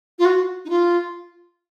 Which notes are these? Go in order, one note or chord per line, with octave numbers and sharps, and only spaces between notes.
F4
F#4
D#4
F4